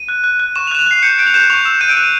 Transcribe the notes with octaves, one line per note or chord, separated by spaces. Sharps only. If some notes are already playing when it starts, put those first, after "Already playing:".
Already playing: D#7
F#6
F#6
F#6
C#6 E7
F7
F#6 E7
F7
F#6 C7
G6 C#7
G6 D7
F7
G6 E7
C#6 F7
E6 E7
G6 D#7
D7
F#6 D#7